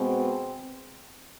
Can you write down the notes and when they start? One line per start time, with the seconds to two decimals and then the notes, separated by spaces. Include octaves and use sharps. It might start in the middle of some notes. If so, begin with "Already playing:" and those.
Already playing: B2 G#3 B3 C4